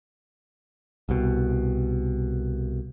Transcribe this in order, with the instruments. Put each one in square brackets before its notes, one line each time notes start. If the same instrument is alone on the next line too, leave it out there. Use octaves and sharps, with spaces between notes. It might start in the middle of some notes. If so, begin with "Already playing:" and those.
[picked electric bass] C2 B2